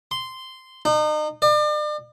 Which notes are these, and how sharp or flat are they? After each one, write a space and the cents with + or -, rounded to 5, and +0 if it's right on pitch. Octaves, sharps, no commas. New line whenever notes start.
C6 -10
D#4 -35
D5 +40